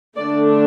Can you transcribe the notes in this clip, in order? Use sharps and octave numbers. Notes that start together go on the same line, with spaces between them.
D3 A3 D4 D5